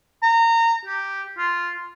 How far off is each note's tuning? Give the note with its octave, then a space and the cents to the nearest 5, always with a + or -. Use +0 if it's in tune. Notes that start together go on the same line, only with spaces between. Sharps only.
A#5 -25
G4 -5
F4 -5